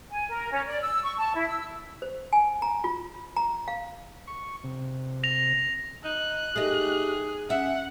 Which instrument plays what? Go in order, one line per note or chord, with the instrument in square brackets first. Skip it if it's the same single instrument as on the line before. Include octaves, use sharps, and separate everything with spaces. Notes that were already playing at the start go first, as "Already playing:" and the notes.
[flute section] G#5
A#4
C#4
D5
E6
C#6
A5
E4
E6
[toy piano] C5
G#5
A#5
F4
A#5
F5
[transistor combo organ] C#6
C3
[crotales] A#6 F7
[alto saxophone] D#4 [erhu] F#6
[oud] A3 D#4 [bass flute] G4 [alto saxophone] G#4
[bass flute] C#4 [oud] E5 [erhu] F#5